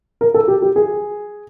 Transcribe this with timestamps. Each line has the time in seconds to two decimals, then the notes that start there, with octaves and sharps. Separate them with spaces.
0.21 A#4
0.34 A4
0.48 G4
0.62 G4
0.76 G#4